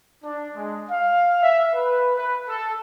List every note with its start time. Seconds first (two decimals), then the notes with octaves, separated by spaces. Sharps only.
0.24 D4
0.55 G#3
0.90 F5
1.42 E5
1.74 B4
2.17 B4
2.48 A4